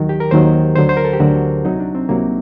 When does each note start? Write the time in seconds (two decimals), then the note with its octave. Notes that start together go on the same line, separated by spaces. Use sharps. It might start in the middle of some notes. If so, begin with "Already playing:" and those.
Already playing: D#2 D#3 F#3
0.09 G4
0.20 A#4
0.31 D#2 D#3 F#3 C5
0.76 D2 D3 F#3 C5
0.89 C5
0.97 A#4
1.05 A4
1.13 G4
1.20 D2 D3 F#3 F#4
1.65 C2 C3 F#3 D#4
1.80 D4
1.95 C4
2.09 C2 C3 F#3 A#3